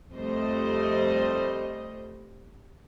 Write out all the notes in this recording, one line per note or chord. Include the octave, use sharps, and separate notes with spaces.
F2 G3 A3 C5 D#5